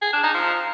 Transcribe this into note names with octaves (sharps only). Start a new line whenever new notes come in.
G#4
D4
D#4
F3